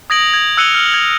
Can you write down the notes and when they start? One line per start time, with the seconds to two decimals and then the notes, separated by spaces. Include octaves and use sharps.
0.10 D#6 G#6 A#6 D7 F#7
0.34 G#6
0.57 E6 F#6 C#7 D#7 F7 G7
0.75 F6
0.94 G#6